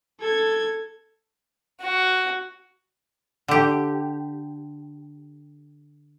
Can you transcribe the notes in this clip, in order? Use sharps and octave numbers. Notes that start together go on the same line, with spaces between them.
A4 G#6
F#4
D3 G4